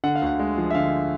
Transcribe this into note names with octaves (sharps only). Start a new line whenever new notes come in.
D3 F#5
F5
D2 F#5
G#3
F3
E5
D3 F5